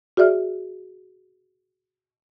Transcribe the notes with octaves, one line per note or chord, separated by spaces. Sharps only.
F#4 G#4 D5 E5 F6